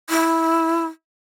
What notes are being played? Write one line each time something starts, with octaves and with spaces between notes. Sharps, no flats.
E4